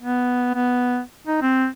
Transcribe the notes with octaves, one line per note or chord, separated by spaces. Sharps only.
B3
B3
D#4
C4